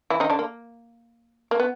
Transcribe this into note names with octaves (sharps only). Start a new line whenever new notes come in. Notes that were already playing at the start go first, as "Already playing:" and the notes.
E3 E4
D#3 D#4
D3 D4
A#3
A#3
B3